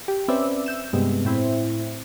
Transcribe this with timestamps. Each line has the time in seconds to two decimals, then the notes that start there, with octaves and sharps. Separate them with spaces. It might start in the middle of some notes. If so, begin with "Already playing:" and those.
0.08 G4
0.28 C4 C#4 B4 D5 E5
0.66 E6 G6 E7
0.93 G2 C3 G#3 B3
1.25 A2 C4 E4